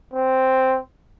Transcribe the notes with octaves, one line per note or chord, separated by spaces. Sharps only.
C4